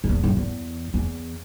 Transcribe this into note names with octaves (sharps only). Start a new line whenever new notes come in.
F#2
E2
F#2
E2
E2